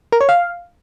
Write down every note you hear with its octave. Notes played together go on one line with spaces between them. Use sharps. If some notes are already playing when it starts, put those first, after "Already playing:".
A#4
C#5
F5